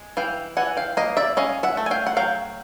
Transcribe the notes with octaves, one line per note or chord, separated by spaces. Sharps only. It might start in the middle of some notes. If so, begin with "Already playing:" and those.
Already playing: G#3
E3 F5 G5
E3 F#5 G#5
F5 G5
A#3 D#5 F5
D5 E5
C#4 D#5 F5
E5 F#5
A3
G#5
F5 G5
F#5
F#3 F5 G5